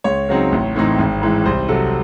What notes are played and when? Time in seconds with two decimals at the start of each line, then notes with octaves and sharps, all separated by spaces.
0.04 C#2 C#5
0.28 C#3 F#3 C4 D#4
0.52 A1
0.75 A2 E3 C4 D#4
0.98 G#1
1.22 G#2 E3 G#3
1.45 C2 C5
1.68 C3 F#3 A4